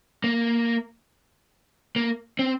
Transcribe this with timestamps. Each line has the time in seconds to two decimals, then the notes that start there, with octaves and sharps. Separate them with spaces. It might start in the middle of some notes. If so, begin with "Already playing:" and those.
0.24 A#3
1.96 A#3
2.39 C4